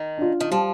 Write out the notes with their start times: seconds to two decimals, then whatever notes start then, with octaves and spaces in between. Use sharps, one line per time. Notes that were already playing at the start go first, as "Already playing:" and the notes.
Already playing: D#3
0.18 D4 F4
0.40 D#3
0.51 F3 G3